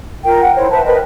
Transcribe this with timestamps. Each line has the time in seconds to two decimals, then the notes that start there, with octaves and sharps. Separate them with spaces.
0.24 F4 A#4 G5
0.41 F#5
0.55 E4 C5 C#5
0.70 B4 C5 E5 A5
0.86 A#4 B4 D#5 G5